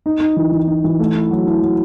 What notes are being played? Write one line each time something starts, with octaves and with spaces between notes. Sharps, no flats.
D#4
D#4
E3
E3
D#4
E3
A3
E4
F#3
E4
F#3